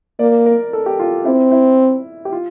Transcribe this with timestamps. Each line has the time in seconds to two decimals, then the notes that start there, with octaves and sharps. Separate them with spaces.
0.19 A#3 D5
0.46 A#4
0.73 A4
0.86 G4
0.99 F4
1.25 C4 E4
1.52 E4
2.25 G4
2.32 F4